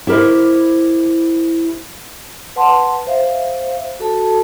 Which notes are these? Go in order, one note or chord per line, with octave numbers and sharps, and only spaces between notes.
E4 G4 A#4 C5 D#5
B4 F#5 A5 C6
C5 E5 F5
F#4 A4 A5